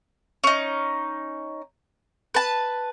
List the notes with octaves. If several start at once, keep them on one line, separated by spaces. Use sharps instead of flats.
C#4 D#4
B4 A5